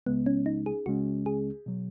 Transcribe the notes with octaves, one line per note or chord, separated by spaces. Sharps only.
C#2 C#3 G#3 B3
C#4
D#4
G#4
C#2 C#3 G#3 C#4 F#4
G#4
B2 F#3